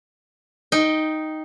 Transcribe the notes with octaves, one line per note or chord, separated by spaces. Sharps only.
D#4 G5